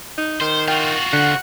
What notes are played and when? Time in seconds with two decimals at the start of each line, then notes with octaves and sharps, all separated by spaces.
0.18 D#4
0.41 D#3 C5
0.68 F4 F#4 G5
1.13 D3 F#5